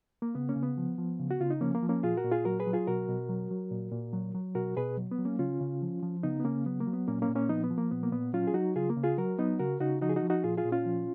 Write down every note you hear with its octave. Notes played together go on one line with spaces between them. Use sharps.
A#3
C#3 B3
A#3 C#4
C#3
B3
F3
F3
C#3
F#4
C#3 F4
D#4
F3 A#3 C#4
A#3
F3
A#3 C#4
A#2 F4 G#4
F#4 A#4
A#2
F4 G#4
F#3 F#4 A#4
G#4 B4
F#3
F4 G#4
B2 F#4 A#4
B2
F#3
F#3
A#2
A#2
F#3
F#3
B2 F#4 A#4
B2 G#4 B4
F#3
B3
F#3
A#3 C#4
C#3 C#4 F4
C#3
F3
F3
C#3 B3 D#4
B3
C#3 A#3 C#4
F#3 B3
A#3
F#3
B3
A#2 A#3 C#4
A#3 C#4
A#2
A#3 C#4
F3 B3 D#4
B3
F3
A#3
A#2 B3
A#3
A#2 B3
F#3 C#4 F4
G#4
F#3 D#4 F#4
C#3 F4 G#4
A#3
C#3
F4 G#4
F#3 F#4 A#4
F#3 B3 D#4
C#3 F#4 A#4
C#3 D#4 F#4
F3 D#4 F#4
G#4
D#4 F#4
F3
D#4 F#4
A#2 F4 G#4
F4 G#4
A#2
C#4 F4
F3